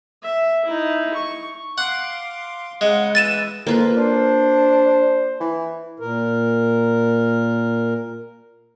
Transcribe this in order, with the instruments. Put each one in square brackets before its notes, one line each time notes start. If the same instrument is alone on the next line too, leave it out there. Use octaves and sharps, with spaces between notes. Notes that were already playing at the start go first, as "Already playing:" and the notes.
[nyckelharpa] E5
D#4 E4
C#6
[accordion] F5 C6 D6 [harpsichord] F#5
[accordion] C#3 F#5 [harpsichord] G#3
[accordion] E3 B4 E6 [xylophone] A6 D#7 E7
[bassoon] F2 [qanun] A#3 F4 B4
[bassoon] D4 [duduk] C5
[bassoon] E3
[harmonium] A#2 A#4